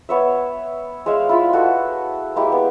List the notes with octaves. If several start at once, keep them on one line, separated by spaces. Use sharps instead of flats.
B3 C#5 E5
G#3 C#5 E5 F5
E4 F4 B5
F#4 G#4 A4
G#3 A#3 E4 G4
B3